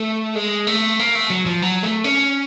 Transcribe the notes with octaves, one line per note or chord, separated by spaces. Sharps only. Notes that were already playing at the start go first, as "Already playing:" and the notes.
Already playing: A3
G#3
A3
A#3
A3
F#3
F3
F#3
A3
C#4